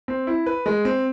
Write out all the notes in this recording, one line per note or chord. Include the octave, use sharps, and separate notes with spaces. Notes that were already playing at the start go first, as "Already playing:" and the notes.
C4
E4
B4
G#3
C4